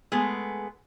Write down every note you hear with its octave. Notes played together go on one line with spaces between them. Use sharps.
G#3 A3 B3 G#4